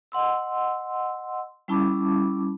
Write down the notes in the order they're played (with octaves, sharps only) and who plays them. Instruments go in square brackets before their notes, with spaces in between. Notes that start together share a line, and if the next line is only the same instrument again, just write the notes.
[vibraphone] D#5 F#5 C6 E6
G3 C#4 E4 A5 B5 D6